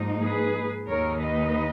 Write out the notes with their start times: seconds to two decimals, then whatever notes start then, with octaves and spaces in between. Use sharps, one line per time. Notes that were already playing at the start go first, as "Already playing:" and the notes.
Already playing: G#2 F3 A#3 D#4
0.22 G#4 B4
0.88 D#2 D#3 A#3 D#4 A#4 C#5
1.22 B4 D#5